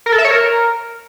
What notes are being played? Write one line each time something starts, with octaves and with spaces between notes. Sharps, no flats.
A#4
A4
E5
C#5
A#4